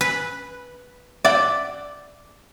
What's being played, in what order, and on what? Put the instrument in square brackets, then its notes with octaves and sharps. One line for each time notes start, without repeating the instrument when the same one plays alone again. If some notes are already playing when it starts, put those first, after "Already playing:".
[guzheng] B4
[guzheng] D5 [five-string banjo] E5 F#5 G5